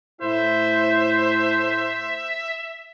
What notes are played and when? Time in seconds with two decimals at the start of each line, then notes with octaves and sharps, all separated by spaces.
0.21 A2 A3 E4 C5 E5